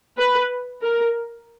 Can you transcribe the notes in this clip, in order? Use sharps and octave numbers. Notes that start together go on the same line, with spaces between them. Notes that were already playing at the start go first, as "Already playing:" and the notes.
B4
A#4